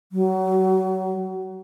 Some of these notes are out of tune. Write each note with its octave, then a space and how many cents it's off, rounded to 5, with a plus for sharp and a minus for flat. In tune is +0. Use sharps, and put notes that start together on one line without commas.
F#3 +25